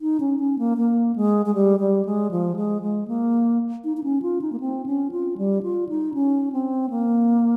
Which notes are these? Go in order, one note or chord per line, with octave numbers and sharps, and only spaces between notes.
D#4
C#4
C#4
A#3
A#3
G#3
G#3
G3
G3
G#3
F3
G#3
G#3
A#3
D#4
D#4
C#4
F4
D#4
A#3
C4
C#4
F4
G3
F4
D#4
C#4
C4
A#3